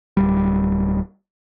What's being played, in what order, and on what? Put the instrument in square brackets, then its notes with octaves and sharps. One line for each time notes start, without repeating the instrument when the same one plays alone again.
[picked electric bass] D1 G3